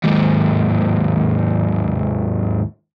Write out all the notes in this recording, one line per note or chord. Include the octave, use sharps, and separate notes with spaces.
D#2 G#2